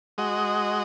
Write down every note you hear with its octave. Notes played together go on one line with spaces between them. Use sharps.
G#3 F#4 D#5